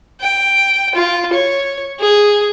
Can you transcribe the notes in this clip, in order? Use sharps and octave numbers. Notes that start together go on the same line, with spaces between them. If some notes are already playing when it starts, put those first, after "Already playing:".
G5
F4
C#5
G#4